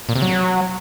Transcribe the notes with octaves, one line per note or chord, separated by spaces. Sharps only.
A#2
C3
F#3